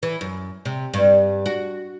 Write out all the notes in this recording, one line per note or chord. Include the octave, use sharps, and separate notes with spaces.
E3
F#2
C3
G2
F#4